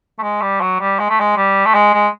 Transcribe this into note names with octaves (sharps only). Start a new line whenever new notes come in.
A3
G#3
G3
F#3
G3
G#3
A3
G#3
G3
A3
G#3
G#3